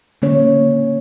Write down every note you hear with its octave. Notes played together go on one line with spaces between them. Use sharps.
D3 A#3 C#4 C#5